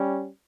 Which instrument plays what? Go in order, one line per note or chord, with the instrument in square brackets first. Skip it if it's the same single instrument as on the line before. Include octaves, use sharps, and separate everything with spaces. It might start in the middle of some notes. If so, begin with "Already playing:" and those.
Already playing: [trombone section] G3 C#4